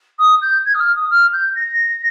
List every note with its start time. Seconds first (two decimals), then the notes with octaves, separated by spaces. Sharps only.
0.19 D#6
0.42 G6
0.65 G#6
0.74 D#6
0.79 F6
0.96 D#6
1.10 F6
1.33 G6
1.55 A#6